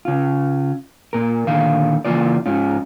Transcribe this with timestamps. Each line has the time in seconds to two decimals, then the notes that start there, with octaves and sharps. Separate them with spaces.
0.05 C#3 F4
1.13 A#2 A#4
1.47 A#2 D3 D#3 F5
2.05 C#3 E3 A#3 F4 D5
2.46 G#2 C#4 F4